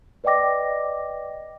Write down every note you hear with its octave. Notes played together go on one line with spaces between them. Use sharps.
B4 D5 D#5 G5 D6 A#6